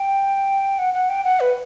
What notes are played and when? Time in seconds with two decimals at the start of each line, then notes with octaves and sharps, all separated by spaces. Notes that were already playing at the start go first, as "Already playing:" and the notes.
Already playing: G5
0.79 F#5
0.94 F#5
1.09 G5
1.24 F#5
1.40 B4